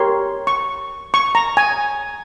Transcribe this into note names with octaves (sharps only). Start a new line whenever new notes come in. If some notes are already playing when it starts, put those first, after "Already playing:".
Already playing: G4 A#4 C#5 C6
C#6
C#6
A#5
G#5